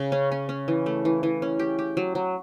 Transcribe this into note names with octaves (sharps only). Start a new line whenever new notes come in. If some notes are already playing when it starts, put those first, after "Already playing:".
Already playing: C#3
C#4
C#4
C#4
E3
A3
E3
E3
C#4
G4
G4
F#3
F#3